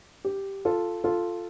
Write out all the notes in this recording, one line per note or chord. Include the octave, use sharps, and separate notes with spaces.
G4
F4 A4
F4 A4